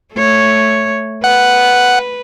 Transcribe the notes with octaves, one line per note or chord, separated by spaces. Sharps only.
A3 C#5
B4 F#5